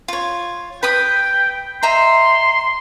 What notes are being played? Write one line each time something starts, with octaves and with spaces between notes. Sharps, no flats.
F4 C#5
B4 G5 B5 D#6
D#5 E5 A#5 C6